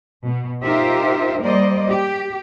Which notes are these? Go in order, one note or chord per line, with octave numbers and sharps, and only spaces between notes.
B2
D#4 F4 G4 A#4 C5 E5
G3 A#3 C5 D5 D#5
G4